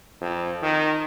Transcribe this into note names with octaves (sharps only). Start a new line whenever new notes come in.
F2
D#3